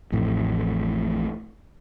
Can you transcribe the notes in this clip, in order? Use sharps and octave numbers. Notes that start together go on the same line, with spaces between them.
A1 F2 A2